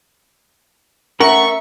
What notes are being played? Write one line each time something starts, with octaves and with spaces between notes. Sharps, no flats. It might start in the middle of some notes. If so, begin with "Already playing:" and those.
A3 C#4 A#4 E5 F#5 C#6